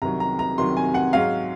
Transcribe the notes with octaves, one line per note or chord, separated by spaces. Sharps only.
C2 C3 D#3 F#3 A#5
A#5
A#5
C2 C3 D#3 F#3 C6
G#5
F#5
G#2 F#3 F5